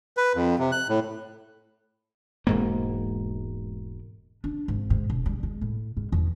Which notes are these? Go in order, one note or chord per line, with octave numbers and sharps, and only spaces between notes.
B4
F2
C3
F#6
A2
E1 G#2 A#3
D4
G#1
G#2
E1
G3
G#3
A2
G#2
E2